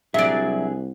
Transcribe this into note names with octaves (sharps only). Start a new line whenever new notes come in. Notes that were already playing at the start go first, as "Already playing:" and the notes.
C2 F#3 D4 G#4 D5 E5